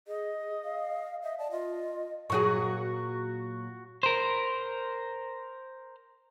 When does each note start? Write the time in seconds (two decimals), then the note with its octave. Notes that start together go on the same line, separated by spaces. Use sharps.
0.08 G#4 D#5
0.64 F5
1.23 D#5 E5
1.39 D5 A5
1.51 F4 D#5
2.30 A#2 F#3 F#4 G#4 C#6
4.03 A#4 C5